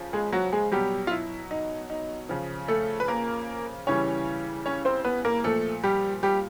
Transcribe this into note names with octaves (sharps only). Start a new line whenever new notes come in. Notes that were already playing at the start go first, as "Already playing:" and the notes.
Already playing: C#3 F3
G#3 G#4
F#3 F#4
G#3 G#4
B2 F#3 G3 G4
F4
E4
D#4
D#4
C#3 F3
A3 A4
B4
A#3 A#4
C#3 E3 G3 C#4 C#5
C#4 C#5
C4 C5
B3 B4
A#3 A#4
A#2 F3 A3 A4
G3 G4
G3 G4